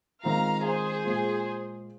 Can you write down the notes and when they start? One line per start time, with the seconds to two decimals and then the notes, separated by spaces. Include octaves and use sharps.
0.23 G#2 D#3 C4 F4 F5 A#5
0.63 G#4 C5
1.04 A#2 G#3 F4